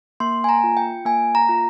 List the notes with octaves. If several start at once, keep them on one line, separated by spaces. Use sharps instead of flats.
A#3 C6
G#5
A#5
F4
G5
A#3 G#5
A#5
F4